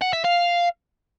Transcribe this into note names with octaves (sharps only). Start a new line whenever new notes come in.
F#5
E5
F5